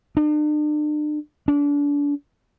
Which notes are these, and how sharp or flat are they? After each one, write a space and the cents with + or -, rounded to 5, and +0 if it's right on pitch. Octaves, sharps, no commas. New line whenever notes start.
D4 +40
D4 -30